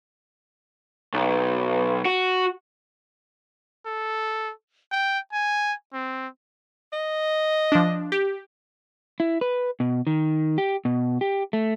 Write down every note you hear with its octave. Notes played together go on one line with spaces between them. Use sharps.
B1
F#4
A4
G5
G#5
C4
D#5
F3 D4
G4
E4
B4
B2
D#3
G4
B2
G4
A3